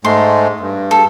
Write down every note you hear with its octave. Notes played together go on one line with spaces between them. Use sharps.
G#2 G#3 A3 C6
G2
A4